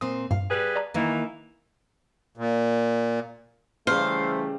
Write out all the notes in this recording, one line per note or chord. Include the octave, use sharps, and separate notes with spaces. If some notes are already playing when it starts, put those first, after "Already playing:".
A#2 C4 D#6
G2 A#2 F5
G3 G#4 B4
D5 A5 A#5
D#3 E3 A#3
A#2
C#3 E3 G3 A3 C5 F5 A#5